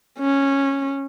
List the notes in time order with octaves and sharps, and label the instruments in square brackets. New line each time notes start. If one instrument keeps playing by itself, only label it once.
[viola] C#4